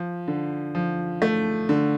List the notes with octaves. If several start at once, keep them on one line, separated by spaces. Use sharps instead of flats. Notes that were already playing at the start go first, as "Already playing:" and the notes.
Already playing: F3
D3
F3
A3
D3